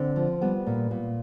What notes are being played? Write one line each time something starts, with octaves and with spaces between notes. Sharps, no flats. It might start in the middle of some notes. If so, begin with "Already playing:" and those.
Already playing: D3 C4
F3
G3 B3
A#2
A#2